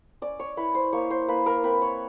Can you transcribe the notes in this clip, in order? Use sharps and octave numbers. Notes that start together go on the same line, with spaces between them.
C#4 D5
C#5
E4 B4
C5
A#3 C#5
C5
A#3 B4
A#4
C4 B4
C#5